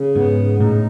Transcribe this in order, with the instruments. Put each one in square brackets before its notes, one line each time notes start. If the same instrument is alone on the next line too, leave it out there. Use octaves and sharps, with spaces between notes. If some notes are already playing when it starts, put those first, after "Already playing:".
Already playing: [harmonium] C#3
[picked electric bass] G#2 [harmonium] B3
[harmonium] C#3
[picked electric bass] A2 [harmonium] D#4